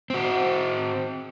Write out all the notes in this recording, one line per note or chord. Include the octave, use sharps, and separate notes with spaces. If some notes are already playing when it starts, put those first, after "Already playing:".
C4 F#4